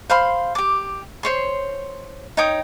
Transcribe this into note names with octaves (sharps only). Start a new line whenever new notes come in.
C5 F5 B5 C6
G4 D6
C5 C#5 C6
D#4 C#5 G5 D#6